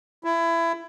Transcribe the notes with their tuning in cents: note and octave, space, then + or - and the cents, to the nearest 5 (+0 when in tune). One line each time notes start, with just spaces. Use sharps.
E4 +20